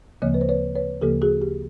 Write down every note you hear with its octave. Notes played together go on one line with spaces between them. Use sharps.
D2 C#3 F3 A#3 C#5 D#5
B4
C5
B4 C#5
B4 C#5
D2 C#3 F3 A#3 G4 A4
F#4 G#4
G4